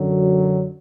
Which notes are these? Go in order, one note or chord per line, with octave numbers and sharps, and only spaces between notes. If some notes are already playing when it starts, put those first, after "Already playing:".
Already playing: F#2 D3 F#3